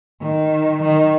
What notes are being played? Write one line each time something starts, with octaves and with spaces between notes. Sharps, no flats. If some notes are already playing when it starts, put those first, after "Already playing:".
D#3
D#3